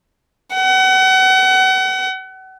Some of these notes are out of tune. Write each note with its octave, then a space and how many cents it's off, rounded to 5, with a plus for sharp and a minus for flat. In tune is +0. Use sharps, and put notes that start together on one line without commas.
F#5 +35